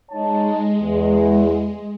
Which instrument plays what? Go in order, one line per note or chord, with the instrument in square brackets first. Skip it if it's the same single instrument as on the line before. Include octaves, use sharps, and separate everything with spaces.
[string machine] G#3 [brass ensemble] D#4 C#5 A5
[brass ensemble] E2